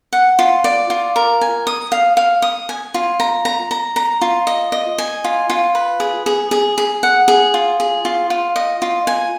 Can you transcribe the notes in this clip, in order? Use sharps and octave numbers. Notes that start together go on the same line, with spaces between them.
F#5
F4
D5
F4
A#4
G#5
D#6
F5
F5
D#6
G#5
F4
A#5
A#5
A#5
A#5
F4
D#5
D#5
G#5
F4
F4
B4
G#4
G#4
G#4
G#4
F#5
G#4
F4
G#4
F4
F4
D#5
F4
G#5